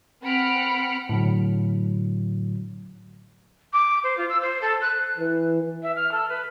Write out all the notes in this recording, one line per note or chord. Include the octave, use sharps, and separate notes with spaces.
C4 F#5 B5 F6 C#7 D7
A2 D3 F#3
D6
C5
F4
E6
C5
A4
F#6
E3
E5
F6
A4
B4